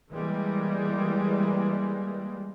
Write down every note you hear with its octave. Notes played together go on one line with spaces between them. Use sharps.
E3 G3 G#3 A#3